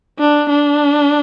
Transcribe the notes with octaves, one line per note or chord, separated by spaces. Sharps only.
D4
D4